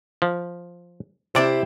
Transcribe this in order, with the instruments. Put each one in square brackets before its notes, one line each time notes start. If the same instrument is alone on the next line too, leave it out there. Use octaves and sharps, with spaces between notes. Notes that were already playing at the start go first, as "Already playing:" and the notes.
[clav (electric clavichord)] F3
[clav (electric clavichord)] C3 D5 [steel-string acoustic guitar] E4 G4 C5